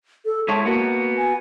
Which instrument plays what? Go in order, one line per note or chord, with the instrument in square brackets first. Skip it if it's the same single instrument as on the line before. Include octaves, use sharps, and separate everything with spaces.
[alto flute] A4
[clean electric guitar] G#3 E4 C#5 [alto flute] A5
[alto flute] A#3 [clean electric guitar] B3 F#4
[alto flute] G#5